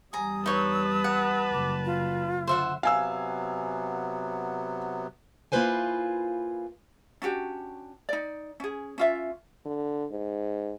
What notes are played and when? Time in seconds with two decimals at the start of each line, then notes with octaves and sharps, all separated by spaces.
0.13 E2 G3 G#5 A#5 D#6
0.46 D#4 B4 C#5 A5
1.04 F#5
1.53 F#1 D6
1.85 F4
2.47 D3 C5 E5 F#5
2.83 C3 F#3 B3 F5 G#5 E6
5.52 A#3 E4 F4 B4 C5 G#5
7.22 C#4 D4 F#4 G4
8.09 D#4 D5
8.60 C#4 G#4
8.98 C#4 F4 E5
9.65 D3
10.11 G#2